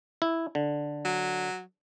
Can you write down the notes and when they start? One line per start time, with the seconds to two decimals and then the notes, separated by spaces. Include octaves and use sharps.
0.22 E4
0.55 D3
1.05 F#3